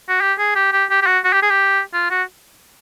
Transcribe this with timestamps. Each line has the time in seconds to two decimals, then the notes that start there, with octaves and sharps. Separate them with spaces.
0.09 F#4
0.21 G4
0.39 G#4
0.55 G4
0.73 G4
0.90 G4
1.02 G4
1.07 F#4
1.24 F#4
1.33 G4
1.42 G#4
1.50 G4
1.94 F4
2.10 F#4